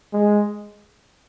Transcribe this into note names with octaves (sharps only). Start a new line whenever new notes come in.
G#3